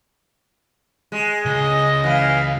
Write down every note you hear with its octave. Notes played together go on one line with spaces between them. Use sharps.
G#3
C#2 D#5
E3 F5